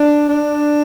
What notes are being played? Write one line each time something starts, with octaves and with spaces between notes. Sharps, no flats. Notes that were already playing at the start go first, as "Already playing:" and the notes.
Already playing: D4
D4